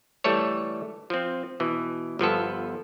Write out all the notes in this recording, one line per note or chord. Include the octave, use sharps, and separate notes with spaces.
E3 G3 A3 A4 C#5
F3 C4
B2 E3
G1 F3 B3 A4